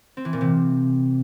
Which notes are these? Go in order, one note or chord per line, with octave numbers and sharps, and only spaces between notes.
C4
E3
A#2
C3